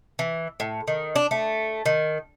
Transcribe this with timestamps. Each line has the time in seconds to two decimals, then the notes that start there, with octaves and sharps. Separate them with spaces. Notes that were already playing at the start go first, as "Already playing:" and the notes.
0.19 E3
0.60 A2
0.87 D#3
1.16 D4
1.31 A3
1.86 D#3